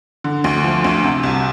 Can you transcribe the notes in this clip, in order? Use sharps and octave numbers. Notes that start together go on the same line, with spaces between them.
D3
D2
F3
D2
C3
C2